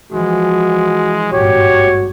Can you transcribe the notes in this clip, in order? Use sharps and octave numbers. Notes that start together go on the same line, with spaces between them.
E3 F3 G#3 F#4
G#1 G2 A#2 F#4 G4 C#5